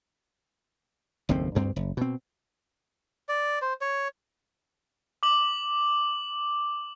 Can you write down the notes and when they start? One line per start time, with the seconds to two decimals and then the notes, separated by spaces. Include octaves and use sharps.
1.29 F#1 D#2 A2 C4
1.55 D2 G2 C4
1.76 F#1
1.97 B2 C4
3.29 D5
3.62 C5
3.81 C#5
5.23 D6 F#7